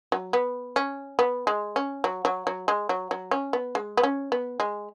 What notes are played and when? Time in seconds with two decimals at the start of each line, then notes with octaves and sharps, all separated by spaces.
0.12 F#3
0.33 B3
0.76 C#4
1.19 B3
1.47 G#3
1.76 C#4
2.04 F#3
2.25 F#3
2.47 F#3
2.68 G#3
2.89 F#3
3.11 F#3
3.31 C#4
3.53 B3
3.75 G#3
3.97 B3
4.03 C#4
4.32 B3
4.60 G#3